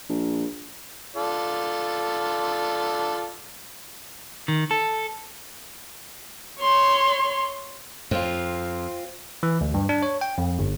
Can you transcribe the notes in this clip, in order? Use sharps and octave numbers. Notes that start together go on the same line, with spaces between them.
A#1
F4 A4 D5
D#3
A4
C#5 C6
F2 C4 F4
E3
D2
G2
D4
C#5
G5
F2
G1